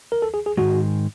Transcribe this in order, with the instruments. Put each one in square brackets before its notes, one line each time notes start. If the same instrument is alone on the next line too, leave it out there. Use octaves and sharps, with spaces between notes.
[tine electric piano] A#4
A4
G#4
G#4
[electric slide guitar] G#2 D#3 G#3 [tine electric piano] F#4